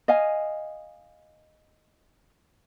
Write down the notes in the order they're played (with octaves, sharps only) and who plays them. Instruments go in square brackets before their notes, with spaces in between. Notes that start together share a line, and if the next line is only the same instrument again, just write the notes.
[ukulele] D#5 F5 G#5